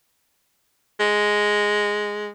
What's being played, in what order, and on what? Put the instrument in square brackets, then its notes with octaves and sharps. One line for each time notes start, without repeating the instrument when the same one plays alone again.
[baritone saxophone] G#3